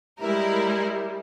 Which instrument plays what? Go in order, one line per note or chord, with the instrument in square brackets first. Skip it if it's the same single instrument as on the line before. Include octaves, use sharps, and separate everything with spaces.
[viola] G3 [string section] G#3 E4 A#4